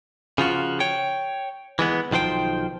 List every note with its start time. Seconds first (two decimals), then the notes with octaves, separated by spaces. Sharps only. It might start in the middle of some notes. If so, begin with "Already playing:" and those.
0.38 C#3 F3 F4 F#4
0.80 C#5 G5
1.79 E3 G#3 B3
2.11 B1 D#3 F3 C5 G5